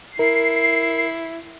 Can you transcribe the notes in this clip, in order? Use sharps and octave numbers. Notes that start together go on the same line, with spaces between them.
E4 A#4 C7